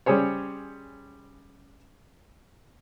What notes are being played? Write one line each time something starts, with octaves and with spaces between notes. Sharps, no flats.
G3 C#4 G#4 C5 C#5